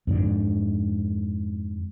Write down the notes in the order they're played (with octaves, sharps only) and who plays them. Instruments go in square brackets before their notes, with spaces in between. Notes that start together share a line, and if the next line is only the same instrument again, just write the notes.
[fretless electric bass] F2 G#2 D3